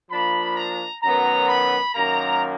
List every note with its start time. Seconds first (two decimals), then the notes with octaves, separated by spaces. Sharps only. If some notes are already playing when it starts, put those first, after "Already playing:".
0.10 F3 A#3 D4 B5
0.56 A#5
1.03 F#2 D#3 F#3 B3 A#5
1.48 B5
1.94 F#2 D#3 A#3 A#5